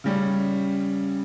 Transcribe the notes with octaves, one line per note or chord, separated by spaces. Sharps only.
C#3 G3 C#4